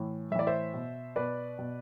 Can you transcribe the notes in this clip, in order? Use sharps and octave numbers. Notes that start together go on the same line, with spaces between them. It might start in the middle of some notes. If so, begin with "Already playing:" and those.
Already playing: A2 E3
A2 E3 D5 E5
C5 E5
B2
B2 B4 D5
B2